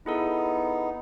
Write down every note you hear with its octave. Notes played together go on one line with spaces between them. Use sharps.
B3 D#4 E4 G#4 A4